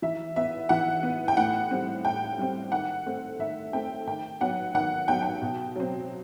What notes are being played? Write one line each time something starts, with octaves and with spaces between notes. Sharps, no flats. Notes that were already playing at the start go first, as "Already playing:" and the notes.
E3 E5
B3 E5
E3 F#5
B3
G5
A2 F#5
G3 C4
A2 G5
G3 C4
D#3 F#5
A3 C4
D#3 E5
A3 C4 G5
D#3 G5
F#3 B3 F#5
D#3 F#5
F#3 B3 G5
G5
B2
F#3 C4